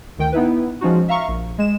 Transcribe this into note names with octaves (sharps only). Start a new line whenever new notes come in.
D2 D#3 G5
B3 D#4 E4 B4
F3 G#3 C#4 D#4 F#4
E5 F5 A#5 C#6
A#1
G#3 E7